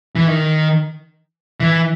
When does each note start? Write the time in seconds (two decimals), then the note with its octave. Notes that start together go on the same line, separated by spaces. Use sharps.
0.16 E3
0.28 D#3
1.60 E3